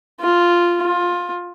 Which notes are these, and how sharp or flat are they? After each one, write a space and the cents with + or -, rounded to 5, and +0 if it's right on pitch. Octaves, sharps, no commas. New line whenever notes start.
F4 -5
F4 +15